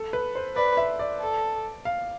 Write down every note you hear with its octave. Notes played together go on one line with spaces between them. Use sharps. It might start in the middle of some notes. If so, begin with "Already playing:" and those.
Already playing: A4
B4
C5
B4 D5
E5
D5
A4
F5